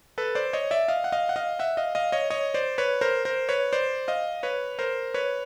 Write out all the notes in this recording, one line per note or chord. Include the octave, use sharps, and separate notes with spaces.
A4 B4
C5 D5
C#5 D#5
D5 E5
D#5 F5
F#5
D#5 F5
F#5
D#5 F5
E5 F#5
D#5 F5
D#5 F5
C#5 D#5
C#5 D#5
C5 D5
B4 C#5
A#4 C5
A#4 C5
B4 C#5
C5 D5
D#5 F5
B4 C#5
A#4 C5
B4 C#5